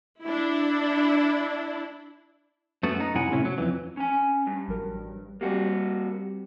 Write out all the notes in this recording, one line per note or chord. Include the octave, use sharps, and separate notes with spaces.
D4 E4
F#2 A3 B3 F#4
D#4
F#2 C3 E4 F#5 G#5
A2 C3 C#4 E4
F#3
F2 E3
C#4 G#5
G2
A1 F#3 A#4
G3 A#3 C4 F#4 G4